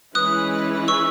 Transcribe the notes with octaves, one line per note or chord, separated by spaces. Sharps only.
E3 G#3 C#4 E4 B4 D#6 F#6
C#6 E6